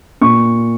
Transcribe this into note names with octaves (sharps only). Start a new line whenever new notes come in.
A#2 C#6